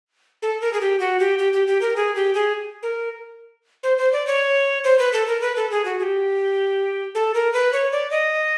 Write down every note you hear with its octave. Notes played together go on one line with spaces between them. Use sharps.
A4
A#4
G#4
G4
F#4
G4
G4
G4
G4
A#4
G#4
G4
G#4
A#4
C5
C5
D5
C#5
C5
B4
A4
A#4
B4
A4
G#4
F#4
G#4
G4
A4
A#4
B4
C#5
D5
D#5